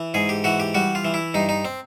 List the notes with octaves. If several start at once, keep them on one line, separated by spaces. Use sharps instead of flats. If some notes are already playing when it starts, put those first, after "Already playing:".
Already playing: E3
G#2 G#4
G4
E3 F#4
G4
G3 F#4
F4
E3
E4
G2 D#4
D#4
C4